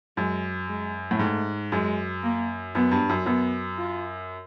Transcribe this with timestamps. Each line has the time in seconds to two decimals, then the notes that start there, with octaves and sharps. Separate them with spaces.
0.17 F#2 G#3
0.69 G#3
1.11 A2
1.19 G#2 A3
1.72 F#2 G#3
2.23 A#3
2.75 F#2 B3
2.91 G2
3.09 F#2
3.25 F#2 B3
3.78 F4